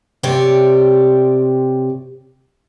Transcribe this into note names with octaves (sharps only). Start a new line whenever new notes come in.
C3 G4 C#5 D5